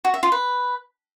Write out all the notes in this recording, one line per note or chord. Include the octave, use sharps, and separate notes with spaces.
F#4
E5
F4
B4